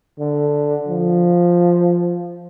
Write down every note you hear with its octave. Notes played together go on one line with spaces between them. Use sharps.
D3
F3